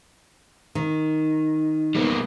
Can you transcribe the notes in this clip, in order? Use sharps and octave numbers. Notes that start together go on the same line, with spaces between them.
D#3
G3 A#3 B3